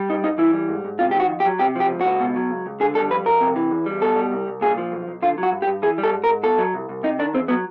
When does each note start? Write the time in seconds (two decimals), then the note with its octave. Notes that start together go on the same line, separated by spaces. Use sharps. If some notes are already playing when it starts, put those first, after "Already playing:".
Already playing: G3
0.09 G2 D#4
0.23 G2 D#4
0.38 E3 E4
0.53 G3
0.69 G#2
0.85 G#2
0.99 C3 F4
1.11 G4
1.14 D#3
1.20 F#4
1.29 F2
1.40 G4
1.45 F#3
1.59 C3 G4
1.75 F3 G4
1.90 C#2
2.01 C#2 F#4
2.20 B2
2.36 F#3
2.50 C#2
2.66 C#2
2.80 D3 G#4
2.95 G3 A4
3.10 F2 B4
3.25 F2 A#4
3.41 C3
3.56 E3
3.71 E2
3.86 G3
4.01 B2 A4
4.16 G3
4.31 C2
4.47 C2
4.61 A#2 G#4
4.78 F3
4.92 B1
5.07 B1
5.22 D3 F4
5.38 F#3
5.43 F#4
5.52 G2
5.62 G4
5.67 G2
5.82 E3 G#4
5.98 G3
6.04 A4
6.14 G#2
6.24 A#4
6.29 G#2
6.43 B2 A4
6.58 F#3
6.74 C2
6.89 C2
7.03 C3 D#4
7.19 D#3 D4
7.33 E2 C4
7.48 F#3 B3